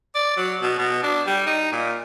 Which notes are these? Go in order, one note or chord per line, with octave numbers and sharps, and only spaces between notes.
D5
F#3
B2
B2
D4
G3
D#4
A#2